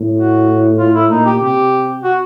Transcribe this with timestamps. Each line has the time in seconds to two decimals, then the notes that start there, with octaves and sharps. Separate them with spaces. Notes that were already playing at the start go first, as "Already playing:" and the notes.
Already playing: A2
0.16 F#4
0.79 F4
0.94 E4
1.10 A#2 D#4
1.25 G4
1.41 C3 G4
2.04 F#4